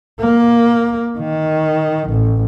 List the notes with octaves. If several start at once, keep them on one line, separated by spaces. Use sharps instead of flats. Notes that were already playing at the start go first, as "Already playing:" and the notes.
A#3
D#3
A1